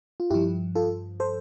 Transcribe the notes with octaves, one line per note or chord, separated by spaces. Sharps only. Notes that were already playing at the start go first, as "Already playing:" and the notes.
F4
G2 F3 E4 G4
F4 A4
A4 C5